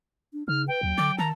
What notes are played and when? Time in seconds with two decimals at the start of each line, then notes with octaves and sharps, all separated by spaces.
0.33 D4
0.48 C#3 D#4 F6
0.68 B4 G5
0.83 D#2 F#3
0.98 D3 D6
1.18 D#3 A5 A#5